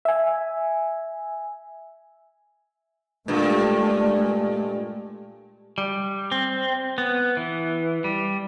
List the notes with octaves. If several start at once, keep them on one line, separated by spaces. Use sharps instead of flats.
E5 G#5
G2 A#2 G#3 A3
G3
C4
B3
E3
G3